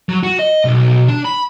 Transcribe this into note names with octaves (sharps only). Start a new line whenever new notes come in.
F#3
F#4
D#5
B1
D4
B5